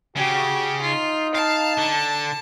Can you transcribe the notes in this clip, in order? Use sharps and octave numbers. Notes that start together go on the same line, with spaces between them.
C#3 F#4 G4
D#4 F4
F5 A5
D3